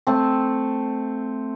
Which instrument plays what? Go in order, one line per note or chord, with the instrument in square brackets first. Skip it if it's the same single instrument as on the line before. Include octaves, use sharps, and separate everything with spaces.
[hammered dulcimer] A3 C4